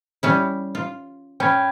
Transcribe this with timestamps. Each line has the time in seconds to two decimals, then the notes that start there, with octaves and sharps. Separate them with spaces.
0.23 G3 C#4 E4
0.75 F4
1.40 C#4 G5 B5 G#6